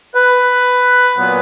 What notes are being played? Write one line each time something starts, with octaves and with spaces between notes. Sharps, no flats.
B4
A#2 F#3 B3